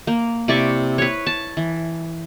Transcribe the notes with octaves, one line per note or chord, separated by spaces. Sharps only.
A#3
C3 E4 D5 C#6
B4 C#5
A5
E3